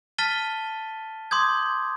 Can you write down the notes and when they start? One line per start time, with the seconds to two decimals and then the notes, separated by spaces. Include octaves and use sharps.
0.18 A5 F6 A6 B6 D#7 G7
1.31 C6 D6 D#6 G6 G#6